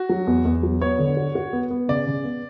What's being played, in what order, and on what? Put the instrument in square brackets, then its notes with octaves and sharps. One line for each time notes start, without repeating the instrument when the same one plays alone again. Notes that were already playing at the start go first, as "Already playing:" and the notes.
Already playing: [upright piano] F#4
[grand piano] F#3
E2
E2
F#3
[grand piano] B3 [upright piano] C#5
[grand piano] D3
F#4
F#4
B3
B3
[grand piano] C#3 [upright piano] D5
[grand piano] C#3
B3